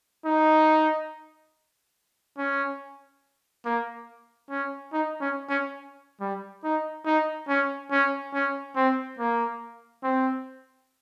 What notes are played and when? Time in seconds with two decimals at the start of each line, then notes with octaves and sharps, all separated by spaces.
0.25 D#4
2.38 C#4
3.65 A#3
4.50 C#4
4.93 D#4
5.21 C#4
5.49 C#4
6.21 G3
6.64 D#4
7.06 D#4
7.48 C#4
7.91 C#4
8.34 C#4
8.76 C4
9.19 A#3
10.03 C4